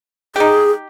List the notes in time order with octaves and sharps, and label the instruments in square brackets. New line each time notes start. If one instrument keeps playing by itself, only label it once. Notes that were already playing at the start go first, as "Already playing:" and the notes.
[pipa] D#4 G4 [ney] G#4